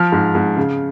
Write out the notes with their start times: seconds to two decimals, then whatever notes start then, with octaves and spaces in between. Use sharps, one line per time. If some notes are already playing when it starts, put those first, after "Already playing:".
Already playing: F3 F6
0.12 G#2
0.35 G#2
0.57 C#3